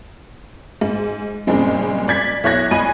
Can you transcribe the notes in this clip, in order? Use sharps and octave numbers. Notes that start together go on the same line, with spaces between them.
G#2
F#1 G2 A#2 C#3 G#3 C4
D5 G#6 B6
B1 E4 C#5 F#6 G#6 A#6
G#1 D#5 G#5 B5 D#7